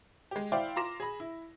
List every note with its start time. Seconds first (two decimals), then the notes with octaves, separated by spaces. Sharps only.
0.31 G#3 G4
0.52 E4 C5 D5 E5 F5 G5
0.76 F4 A#5 C6 D6 A#6 E7
1.00 G#4 B5
1.20 E4